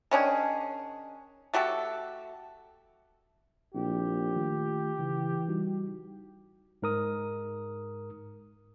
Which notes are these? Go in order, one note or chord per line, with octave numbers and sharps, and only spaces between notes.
D#3 C#4 D4 G#4
A3 F#4 G4 A4
A#1 C4 E4 G4
D#3 A3 F4
C#3 E3
G3 D#4 F#4
G#2 A#4 D#6